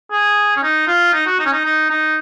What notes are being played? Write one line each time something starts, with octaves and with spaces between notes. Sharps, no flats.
G#4
C#4
D#4
F4
D#4
F#4
D#4
C#4
D#4
D#4
D#4